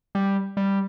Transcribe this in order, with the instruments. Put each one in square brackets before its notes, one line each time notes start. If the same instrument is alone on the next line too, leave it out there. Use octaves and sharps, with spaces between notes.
[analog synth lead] G3
G3